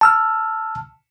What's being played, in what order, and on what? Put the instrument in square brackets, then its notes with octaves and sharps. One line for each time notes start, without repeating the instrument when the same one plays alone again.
[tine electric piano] A5 E6 F6